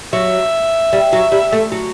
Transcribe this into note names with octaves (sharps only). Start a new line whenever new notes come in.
F#3 E5
G3
F#3
G3
A3
F#3